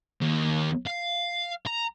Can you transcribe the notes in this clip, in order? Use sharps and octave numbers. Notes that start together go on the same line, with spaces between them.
D#2
F5
A#5